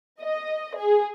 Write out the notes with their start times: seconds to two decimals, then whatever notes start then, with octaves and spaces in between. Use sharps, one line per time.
0.20 D#5
0.76 G#4